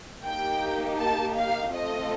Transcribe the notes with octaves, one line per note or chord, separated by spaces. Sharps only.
A#3 D#4 G4 G5
A5
F5
A3 C4 F4 A4 D#5